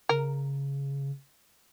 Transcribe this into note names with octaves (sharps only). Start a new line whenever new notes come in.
C#3 A#4